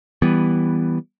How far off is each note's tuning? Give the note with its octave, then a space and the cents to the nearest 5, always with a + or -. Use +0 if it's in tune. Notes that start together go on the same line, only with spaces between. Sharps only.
E3 -5 G3 +0 B3 +0